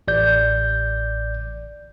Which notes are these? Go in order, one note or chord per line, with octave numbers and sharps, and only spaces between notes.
A1 D5 G6